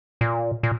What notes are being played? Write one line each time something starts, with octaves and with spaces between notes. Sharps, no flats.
A#2
A#2